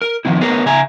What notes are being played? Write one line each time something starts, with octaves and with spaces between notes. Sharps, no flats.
A#4
D#3 F3 C4 E4
B3 G#4 A#4 B4 C#5
C#3 E5 G#5 A#5